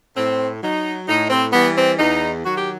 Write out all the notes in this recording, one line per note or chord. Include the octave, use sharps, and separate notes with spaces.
A2 C4
F#3 D#4
A2 D#4
C4
E3 G3 B3
C4
E2 D#4
D#3 F#3 F#4
G4